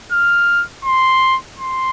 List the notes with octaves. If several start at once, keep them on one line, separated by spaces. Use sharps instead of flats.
F6
C6
C6